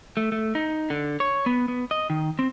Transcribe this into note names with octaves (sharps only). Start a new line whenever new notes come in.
A3
A3
D#4
D3
C#5
B3
B3
D#5
D#3
C4